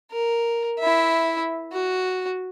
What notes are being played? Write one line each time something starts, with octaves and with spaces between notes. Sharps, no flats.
A#4
E4 E5
F#4